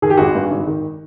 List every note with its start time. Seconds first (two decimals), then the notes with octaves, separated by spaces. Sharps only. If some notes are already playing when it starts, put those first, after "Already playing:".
0.02 D#3 G#4
0.10 G4
0.17 G#1 F#4 G#4
0.35 G2
0.51 G#1
0.67 D#3